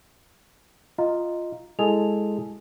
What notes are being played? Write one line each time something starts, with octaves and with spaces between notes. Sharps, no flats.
F4 D#5 A#5
G#3 E4 G#4 A4 F7